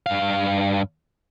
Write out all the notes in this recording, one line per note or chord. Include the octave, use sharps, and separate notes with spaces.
G2 F5